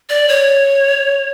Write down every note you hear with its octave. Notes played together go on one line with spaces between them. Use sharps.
D5
C#5